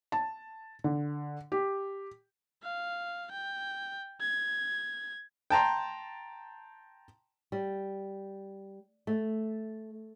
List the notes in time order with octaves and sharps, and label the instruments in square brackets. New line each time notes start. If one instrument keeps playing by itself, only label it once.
[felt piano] A5
D3
G4
[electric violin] F5
G5
G#6
[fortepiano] G5 A5 A#5 C6
[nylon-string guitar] G3
A3